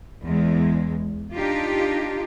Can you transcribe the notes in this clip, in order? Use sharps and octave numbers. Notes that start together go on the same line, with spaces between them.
E2 G#3
D4 D#4 F4 G4